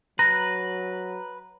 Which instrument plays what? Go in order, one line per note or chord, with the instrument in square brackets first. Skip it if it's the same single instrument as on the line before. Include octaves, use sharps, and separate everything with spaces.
[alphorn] F#3 [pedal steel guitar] B4 [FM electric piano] A#5 [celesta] A#6